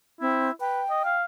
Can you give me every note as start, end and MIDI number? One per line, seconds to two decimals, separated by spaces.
0.21 0.51 60
0.21 0.50 64
0.60 0.82 71
0.60 1.15 79
0.90 1.03 75
1.05 1.25 77